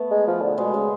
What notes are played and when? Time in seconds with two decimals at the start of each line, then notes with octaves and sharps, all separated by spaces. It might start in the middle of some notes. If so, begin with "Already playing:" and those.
Already playing: A3 B3
0.11 G#3
0.27 F3
0.42 D3
0.58 B2 G#3
0.74 C#3 G#3